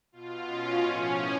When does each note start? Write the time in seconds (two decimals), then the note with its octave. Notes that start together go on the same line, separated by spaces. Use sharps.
0.12 B2 F4
0.47 C#4
0.81 A2 F3